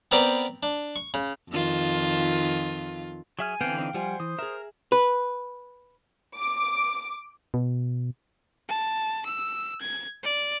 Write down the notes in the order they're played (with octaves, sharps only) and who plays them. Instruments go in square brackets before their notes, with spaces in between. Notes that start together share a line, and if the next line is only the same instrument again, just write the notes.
[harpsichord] B3 C4 A#4 C5 D5
D4
C#6
C#3
[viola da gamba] F2 D#3 F4
[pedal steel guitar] F#3 E5 F6 [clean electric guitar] G#4 [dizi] G#5
[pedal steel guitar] D3 E3 [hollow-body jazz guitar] B3 C4 [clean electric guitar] F5 G5
[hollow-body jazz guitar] C4 D#4
[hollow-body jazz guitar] F3 G3 F4 [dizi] C5 [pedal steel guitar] F#5 G#5
[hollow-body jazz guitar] E3 [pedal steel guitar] D#6
[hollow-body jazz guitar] G#4 E5 [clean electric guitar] A#4
[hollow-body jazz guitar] B4
[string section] D6
[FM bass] B2
[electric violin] A5
E6
G#6
D5